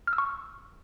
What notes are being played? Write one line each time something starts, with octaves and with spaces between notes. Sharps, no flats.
F6
E6
C#6